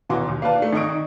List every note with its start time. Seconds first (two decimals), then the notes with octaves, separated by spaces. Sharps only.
0.09 D#1 B2 E3 F#4 C6 D6
0.28 D#2
0.42 A#3 F4 B4 D5 A5
0.58 A3 D4
0.73 G#1 D4 D#5 C#6 D#6 D7
0.89 D#3